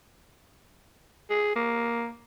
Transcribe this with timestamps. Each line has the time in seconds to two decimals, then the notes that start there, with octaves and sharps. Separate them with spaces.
1.30 G#4
1.56 A#3